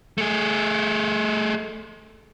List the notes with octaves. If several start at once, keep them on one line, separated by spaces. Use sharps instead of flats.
A3 G#4